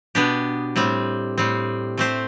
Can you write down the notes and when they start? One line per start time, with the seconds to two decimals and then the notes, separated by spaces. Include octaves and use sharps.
0.15 B2 B3 D4 G4
0.76 A2 G3 C4
1.38 A2 G3 C4
1.97 A3 C4 G4 C5